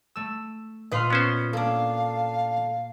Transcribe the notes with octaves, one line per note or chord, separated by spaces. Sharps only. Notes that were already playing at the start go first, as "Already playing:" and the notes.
A3 E6
A#2 F4 B4 D#5 F6
B3 C#4 C5
A#3 D4 A4 F5